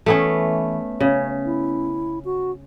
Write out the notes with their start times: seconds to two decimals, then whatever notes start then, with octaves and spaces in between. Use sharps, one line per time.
0.06 E3 A3 B3 C#4
1.00 C#3 C#5
1.45 E4
2.25 F#4